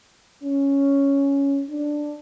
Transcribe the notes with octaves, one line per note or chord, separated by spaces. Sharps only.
C#4
D4